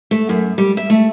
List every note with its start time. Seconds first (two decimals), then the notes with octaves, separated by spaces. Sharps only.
0.11 A3
0.29 F#2
0.58 G3
0.77 E5
0.90 A3